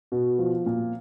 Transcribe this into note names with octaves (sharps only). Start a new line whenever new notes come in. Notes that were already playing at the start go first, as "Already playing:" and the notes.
B2
F3
A#2